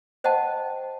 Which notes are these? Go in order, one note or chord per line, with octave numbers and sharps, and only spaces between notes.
C5 D#5 F#5 G5 A5